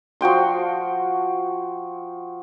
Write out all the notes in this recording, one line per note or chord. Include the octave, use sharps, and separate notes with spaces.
F3 F#4 G5 C6